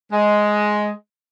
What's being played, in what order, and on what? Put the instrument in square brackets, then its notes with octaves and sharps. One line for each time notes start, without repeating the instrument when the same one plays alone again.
[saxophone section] G#3